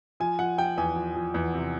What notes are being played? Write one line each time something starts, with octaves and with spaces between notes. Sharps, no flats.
F3 G#5
F3 F#5
F3 G5
E2 G#5
F3
F3
E2
C3